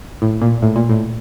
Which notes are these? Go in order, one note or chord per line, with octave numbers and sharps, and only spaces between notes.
A2
A#2
A2
A#2
A2